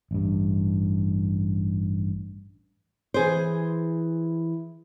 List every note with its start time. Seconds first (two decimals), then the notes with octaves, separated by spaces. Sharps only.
0.11 A1 G2
3.14 E3 G#4 C5